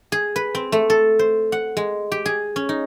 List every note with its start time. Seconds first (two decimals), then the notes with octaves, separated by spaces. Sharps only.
0.12 G#4
0.36 B4
0.55 C4
0.72 A3
0.90 A4
1.19 C5
1.52 F#5
1.77 G#3
2.12 G4
2.26 G#4
2.56 C#4
2.69 D#4